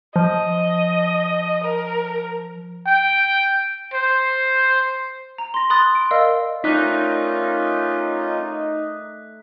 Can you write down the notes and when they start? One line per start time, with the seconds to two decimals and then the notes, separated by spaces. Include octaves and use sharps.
0.16 F3 D#5
1.64 A#4
2.87 G5
3.94 C5
5.38 A#5
5.54 C6 A#6
5.70 B5 C6 D#6 F#6 A6
5.95 D7
6.11 A#4 D5 D#5 F5 E6
6.64 A3 C#4 D#4 F4 A#4 D5 F#6 B6